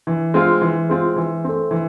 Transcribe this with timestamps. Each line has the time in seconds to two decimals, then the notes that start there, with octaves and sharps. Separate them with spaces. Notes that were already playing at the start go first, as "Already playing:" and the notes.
0.07 E3
0.34 G#3 C4 F4
0.61 E3
0.89 G#3 C4 F4
1.16 E3
1.44 A3 C4
1.71 E3